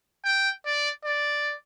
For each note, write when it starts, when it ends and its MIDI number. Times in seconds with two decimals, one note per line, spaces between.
0.25 0.50 79
0.66 0.89 74
1.05 1.54 74